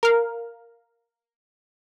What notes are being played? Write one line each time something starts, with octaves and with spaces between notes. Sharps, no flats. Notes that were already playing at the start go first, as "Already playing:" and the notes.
A#4 F5